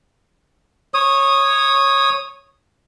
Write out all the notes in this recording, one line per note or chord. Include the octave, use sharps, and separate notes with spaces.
C#5 D#6